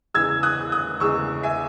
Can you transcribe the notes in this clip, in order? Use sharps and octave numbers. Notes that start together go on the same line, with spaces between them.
E2 C#3 E3 G#3 E6 G#6
D#6 F#6
D#6 F#6
E2 C#3 E3 G#3 C#6 E6
E5 G#5